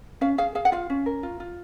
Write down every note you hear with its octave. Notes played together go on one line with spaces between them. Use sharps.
C#4 F5
G#4 F5
G#4 F5
F#5
F4 F5
C#4
A#4
F4
F4